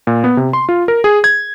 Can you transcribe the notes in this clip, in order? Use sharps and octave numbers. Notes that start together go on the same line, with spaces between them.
A#2
B3
C3
C6
F4
A#4
G#4
G#6